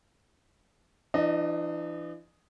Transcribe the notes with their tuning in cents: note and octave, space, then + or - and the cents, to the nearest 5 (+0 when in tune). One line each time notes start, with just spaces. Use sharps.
E3 +35 D4 +45 D#5 +0